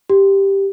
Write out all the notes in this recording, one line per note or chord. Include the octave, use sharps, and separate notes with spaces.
G4